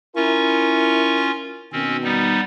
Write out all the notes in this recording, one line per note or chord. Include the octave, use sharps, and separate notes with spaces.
C#4 E4 F4 A#4 C#6
B2 D#3 C4 C#4
G3 B3 D#4